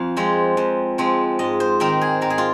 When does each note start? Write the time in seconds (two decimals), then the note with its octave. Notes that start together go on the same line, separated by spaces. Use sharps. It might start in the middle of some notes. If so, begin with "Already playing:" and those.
Already playing: F2 F5
0.17 F3 G#3 C4
0.57 F2
0.98 F3 G#3 C4
1.39 G#2 D#5
1.60 C5
1.80 D#3 C4 A#4
2.01 G#4
2.21 G#2 A#4
2.30 G#4
2.38 F4